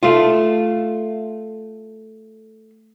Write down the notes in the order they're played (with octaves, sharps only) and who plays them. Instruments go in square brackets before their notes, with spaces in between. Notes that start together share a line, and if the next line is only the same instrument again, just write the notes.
[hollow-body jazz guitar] A3 F4